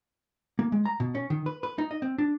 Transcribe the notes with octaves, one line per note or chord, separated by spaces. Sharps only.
A#3
G#3
A#5
B2
C#4
D#3
B4
B4
D#4
D#5
C4
D4